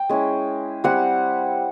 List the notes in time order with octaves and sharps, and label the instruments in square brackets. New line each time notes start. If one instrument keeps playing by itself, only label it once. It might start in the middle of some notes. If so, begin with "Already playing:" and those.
Already playing: [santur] G5
G#3 C#4 E4
G3 C4 E4 F#5